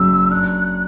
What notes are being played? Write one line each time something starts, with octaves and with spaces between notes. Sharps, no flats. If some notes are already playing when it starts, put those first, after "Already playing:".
Already playing: F#1 F#2 E6
D4 F#6